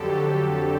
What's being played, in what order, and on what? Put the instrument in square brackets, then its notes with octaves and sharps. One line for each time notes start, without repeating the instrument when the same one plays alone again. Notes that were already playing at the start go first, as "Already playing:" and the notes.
Already playing: [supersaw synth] F2 D3 F#3 G4 A4
G4